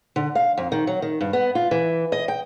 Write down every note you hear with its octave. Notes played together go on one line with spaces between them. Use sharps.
D3
F5
F2
D#3
F#3
D#3
G2
B3
F4
E3
D#5
G5